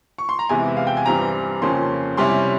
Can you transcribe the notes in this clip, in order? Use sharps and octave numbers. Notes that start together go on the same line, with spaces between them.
C#6
C6
A#5
E2 C3 E3 G#3 E4 G#5
E5
F5
G5
G#5
G2 E3 G3 C4 A#5
F2 C#3 F3 A#3 C#4 C6
C3 G3 C#4 E4 C6